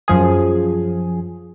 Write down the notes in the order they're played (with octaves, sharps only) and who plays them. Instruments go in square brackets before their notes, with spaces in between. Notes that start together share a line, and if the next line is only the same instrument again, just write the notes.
[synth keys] F#2 F3 G#4